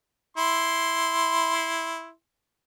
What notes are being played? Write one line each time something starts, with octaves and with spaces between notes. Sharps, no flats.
E4 C6